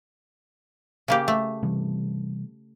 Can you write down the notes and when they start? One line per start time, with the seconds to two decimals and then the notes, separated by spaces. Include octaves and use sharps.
1.08 C#3 A#3 G4
1.28 A3
1.63 C3 E3 G3